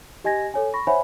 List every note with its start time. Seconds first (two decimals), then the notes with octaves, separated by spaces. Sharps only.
0.24 G4 D#5 G#5 G#6 A#6
0.54 A4 C#5 G#5
0.73 B5 C#6 A#6
0.87 C5 C#5 E5 F#5 G#5 B5